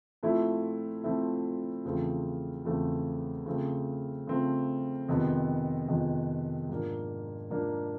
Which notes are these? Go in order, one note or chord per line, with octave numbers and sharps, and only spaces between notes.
A#2 F3 A3 C4 E4
A#2 F3 A3 C4 E4
E2 C#3 F3 A3 C4
E2 C#3 F3 A3 C4
C#3 F3 A3 C4
C#3 F3 A3 C4
F2 C3 D#3 G#3 B3
F2 C3 D#3 G#3 B3
G#2 F3 A#3 D4
G#2 F3 A#3 D4